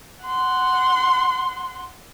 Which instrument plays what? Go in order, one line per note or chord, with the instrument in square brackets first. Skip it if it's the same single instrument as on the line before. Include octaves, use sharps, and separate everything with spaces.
[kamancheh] F#5 C6